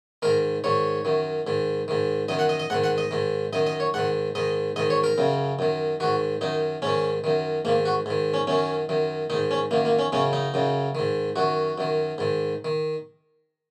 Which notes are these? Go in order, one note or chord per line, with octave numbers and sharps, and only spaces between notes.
G#2 D#3 A#4
G#2 D#3 C#5
F#2 D#3
G#2 D#3
G#2 D#3
F#2 D#3 D#5
F#5
D#5
D#5
G#2 D#3 F#5
F#5
D#5
G#2 D#3
F#2 D#3 D#5
D#5
C#5
G#2 D#3 F#5
G#2 D#3 D#5
G#2 D#3 D#5
C#5
A#4
F#2 C#3
F#2 D#3
G#2 D#3 F#4
F#2 D#3 D#4
G#2 D#3 C#4
F#2 D#3
G#2 D#3 A#3
F#4
G#2 D#3
C#4
F#2 D#3 C#4
F#2 D#3
G#2 D#3 D#4
C#4
F#2 D#3 A#3
A#3
C#4
F#2 C#3 C#4
D#4
F#2 C#3
G#2 D#3
F#2 D#3 F#4
F#2 D#3
G#2 D#3
D#3